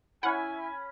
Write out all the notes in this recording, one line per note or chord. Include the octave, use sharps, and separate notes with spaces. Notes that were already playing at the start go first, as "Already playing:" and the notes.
C#4 E4 F#5 G#5 B5